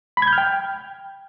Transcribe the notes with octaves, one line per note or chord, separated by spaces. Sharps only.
B5
G#6
G6
F6
G5